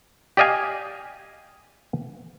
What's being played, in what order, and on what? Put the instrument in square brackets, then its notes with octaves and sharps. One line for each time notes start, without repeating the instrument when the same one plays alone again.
[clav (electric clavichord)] G4 D5 D#5 F5 G#5